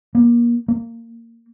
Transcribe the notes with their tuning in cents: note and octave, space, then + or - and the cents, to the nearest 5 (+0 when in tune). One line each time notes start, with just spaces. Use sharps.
A#3 +30
A#3 -20